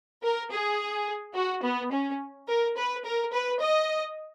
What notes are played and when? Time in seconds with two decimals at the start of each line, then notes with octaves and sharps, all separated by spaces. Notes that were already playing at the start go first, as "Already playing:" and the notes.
0.23 A#4
0.50 G#4
1.34 F#4
1.62 B3
1.92 C#4
2.48 A#4
2.76 B4
3.04 A#4
3.32 B4
3.60 D#5